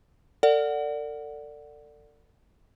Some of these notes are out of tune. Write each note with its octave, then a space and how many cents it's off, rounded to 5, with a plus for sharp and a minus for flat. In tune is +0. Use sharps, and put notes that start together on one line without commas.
A4 +40 D5 +0 F#5 +0